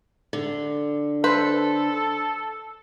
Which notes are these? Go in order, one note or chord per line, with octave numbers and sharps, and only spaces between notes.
D3
A4 B4 C5